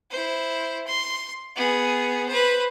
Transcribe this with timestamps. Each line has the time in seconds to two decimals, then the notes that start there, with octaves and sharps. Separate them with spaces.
0.11 E4 C5
0.87 C6
1.56 B3 G#4
2.28 B4 C5